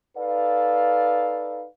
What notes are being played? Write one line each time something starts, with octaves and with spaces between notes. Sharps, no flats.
D#4 A4 B4 D5 F5